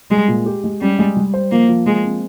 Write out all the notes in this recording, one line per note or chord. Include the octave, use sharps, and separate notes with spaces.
G3 G#3
A#2
G4
G#3
G3 C#4
G#3
G3
C5
F3 A#3
F3
F3 G#3
C4